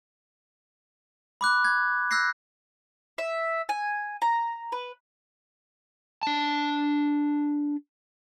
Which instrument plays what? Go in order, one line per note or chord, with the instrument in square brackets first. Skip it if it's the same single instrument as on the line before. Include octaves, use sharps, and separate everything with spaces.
[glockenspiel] B5 D6 F#6
G#6
E6 F#6 G6 A#6 C7
[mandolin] E5
G#5
A#5
B4
[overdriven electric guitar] D4 A5